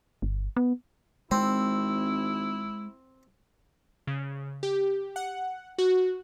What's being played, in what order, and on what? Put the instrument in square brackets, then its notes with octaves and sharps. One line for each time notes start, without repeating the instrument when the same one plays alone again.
[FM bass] G1
B3
[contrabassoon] G#1 [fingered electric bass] G#3 [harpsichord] C4 [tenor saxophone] E4
[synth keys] C#3
G4
F#5
F#4